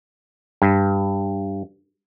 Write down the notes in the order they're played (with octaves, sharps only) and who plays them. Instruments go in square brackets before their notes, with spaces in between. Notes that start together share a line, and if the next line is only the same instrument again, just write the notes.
[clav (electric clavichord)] G2